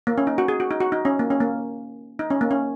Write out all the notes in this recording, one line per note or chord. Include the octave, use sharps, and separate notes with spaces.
A#3
C#4
D#4
F#4
G#4
F#4
D#4
F#4
D#4
C#4
A#3
C#4
A#3
D#4
C#4
A#3
C#4